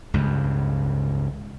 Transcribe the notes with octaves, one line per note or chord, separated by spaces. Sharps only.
C#2 G2